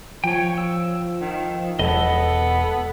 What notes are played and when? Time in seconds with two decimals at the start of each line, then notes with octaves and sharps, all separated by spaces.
0.24 F3 C#5 G5
0.58 E6
1.21 D#3
1.79 E1 B3 A4 D#5 F#5